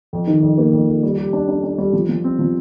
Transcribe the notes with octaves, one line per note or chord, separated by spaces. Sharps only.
F2
D#3
F2
A#3
F2
F2
G3
G4
D4
D4
D4
G3
F3
F3
C4
F3